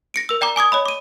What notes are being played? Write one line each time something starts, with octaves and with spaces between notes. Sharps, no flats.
A#6 C#7 D7
A#4 E6
D5 G5 A#5 D6
G#5 D6 D#6 G#6
C#5 D#5 B5
D6 D#7